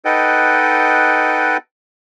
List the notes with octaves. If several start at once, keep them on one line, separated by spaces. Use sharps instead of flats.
D#4 A4 B4 D#5 F#5 G5